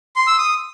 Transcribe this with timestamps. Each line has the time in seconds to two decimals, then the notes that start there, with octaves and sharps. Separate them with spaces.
0.16 C6
0.27 E6
0.38 D#6